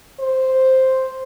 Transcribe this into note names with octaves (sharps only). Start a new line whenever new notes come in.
C5